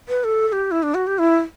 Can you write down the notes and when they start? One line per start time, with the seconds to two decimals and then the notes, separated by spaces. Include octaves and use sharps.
0.08 B4
0.24 A4
0.48 A4
0.52 G4
0.71 E4
0.83 D4
0.94 F#4
1.07 G4
1.18 E4